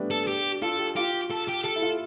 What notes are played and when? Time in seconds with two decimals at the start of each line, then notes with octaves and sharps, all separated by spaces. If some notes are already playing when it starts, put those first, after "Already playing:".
Already playing: G3 A3 B3 D4
0.11 A4
0.27 G4
0.62 F4 A4
0.79 G4
0.96 F4 G4
1.30 A4
1.48 G4
1.64 G4 A4
1.76 E4
1.82 F4